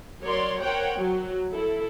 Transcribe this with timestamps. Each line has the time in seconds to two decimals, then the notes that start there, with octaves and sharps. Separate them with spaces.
0.21 F#3 A#4 C#5 D5 C6
0.60 A#4 C5 C#5 F#5 G5
0.98 F#3
1.51 E4 A4